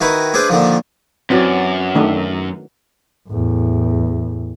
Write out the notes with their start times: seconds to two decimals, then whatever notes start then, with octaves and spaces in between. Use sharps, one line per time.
0.01 D#3 D#4 E4 F#4 B4
0.34 D4 E4 G#4 B4 C5 D5
0.50 A#2 D3 D#3 F3
1.30 F#2 E3 F#3 C4 D5
1.95 D#3 A3 D4
3.28 E2 A2